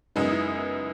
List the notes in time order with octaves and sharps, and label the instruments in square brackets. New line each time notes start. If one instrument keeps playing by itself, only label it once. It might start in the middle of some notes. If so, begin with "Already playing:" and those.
[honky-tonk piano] F#2 C#3 G#3 B3 [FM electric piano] D#4
[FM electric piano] E4